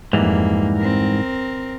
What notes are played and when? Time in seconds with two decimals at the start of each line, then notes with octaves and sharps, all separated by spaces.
0.13 F2 G#2 E3 G3 A#3
0.77 C4 A#4